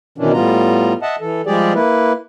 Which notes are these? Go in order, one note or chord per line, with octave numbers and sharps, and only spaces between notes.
B2 D#3 E3 C#4 D4
A2 G3 B3 F4 A#5
D#5 E5 F#5 A5
E3 A4
F3 G3 G#3 G4 G#4 D5
A#3 E4 B4